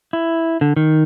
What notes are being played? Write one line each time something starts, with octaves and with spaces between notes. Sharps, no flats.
E4
D3
D#3